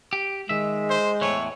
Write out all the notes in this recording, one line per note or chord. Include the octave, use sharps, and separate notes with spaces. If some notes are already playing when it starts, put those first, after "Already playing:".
G4
D#3 G#3 E5
C5
E2 A2 E3 C#5